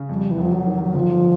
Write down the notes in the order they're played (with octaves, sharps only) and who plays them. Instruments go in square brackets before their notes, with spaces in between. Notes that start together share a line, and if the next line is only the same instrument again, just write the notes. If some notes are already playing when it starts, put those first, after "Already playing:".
Already playing: [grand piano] C#3
[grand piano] F2 [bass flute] G3
[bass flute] E3
[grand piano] F1 [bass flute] F3
[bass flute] F#3
[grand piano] D#3
[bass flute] F#3
[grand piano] G1 [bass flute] F3